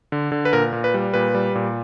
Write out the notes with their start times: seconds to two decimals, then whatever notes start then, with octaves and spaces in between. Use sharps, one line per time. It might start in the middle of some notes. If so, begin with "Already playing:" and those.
0.12 D3
0.32 D3
0.45 B4
0.53 A#2 A#4
0.73 A#2
0.84 B4
0.94 G3
1.14 A#2 B4
1.35 G3
1.55 A#2